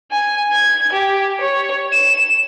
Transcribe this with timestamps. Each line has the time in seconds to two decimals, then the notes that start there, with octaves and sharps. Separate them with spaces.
0.11 G#5
0.52 G#6
0.93 G4
1.41 C#5
1.92 E7